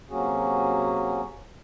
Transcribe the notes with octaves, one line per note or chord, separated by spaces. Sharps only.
C3 F#3 A#3 C#4 F#4 G#4